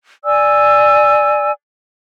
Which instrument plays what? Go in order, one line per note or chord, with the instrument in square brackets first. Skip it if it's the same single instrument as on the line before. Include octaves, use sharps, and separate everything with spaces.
[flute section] D5 G#5 E6